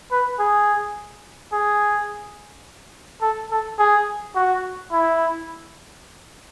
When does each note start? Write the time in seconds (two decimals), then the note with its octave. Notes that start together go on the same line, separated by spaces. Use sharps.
0.11 B4
0.40 G#4
1.53 G#4
3.22 A4
3.51 A4
3.79 G#4
4.35 F#4
4.92 E4